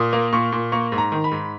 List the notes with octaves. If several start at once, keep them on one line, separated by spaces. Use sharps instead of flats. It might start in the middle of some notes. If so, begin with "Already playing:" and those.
Already playing: A#2 D#6
A#3
A#2 C#6
A#2
A#3 C#6
G#2
A#5
D#3
B5
G#2